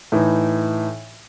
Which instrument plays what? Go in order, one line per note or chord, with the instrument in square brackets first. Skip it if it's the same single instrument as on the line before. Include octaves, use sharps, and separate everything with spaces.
[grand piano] A2 E3 D#4